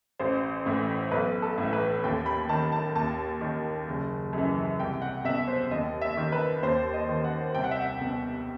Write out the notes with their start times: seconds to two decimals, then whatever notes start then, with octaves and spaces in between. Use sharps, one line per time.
0.19 A1 C5
0.66 A2 E3
1.11 B1 B4
1.42 A4
1.58 A2 E3
1.73 B4
2.04 D#2 G5
2.26 B5
2.49 D#3 A5
2.72 A5
2.95 D#2 A5
3.41 D#3
3.88 F#1
4.33 F#2 E3
4.80 C2 G5
5.02 F#5
5.24 B2 E5
5.48 C5
5.71 D#2 D#5
6.01 E5
6.17 D#3
6.32 B4
6.62 D#2 C5
6.94 D#5
7.09 D#3
7.24 F#5
7.55 C2 G5
7.64 F#5
7.71 E5
7.80 F#5
8.01 B2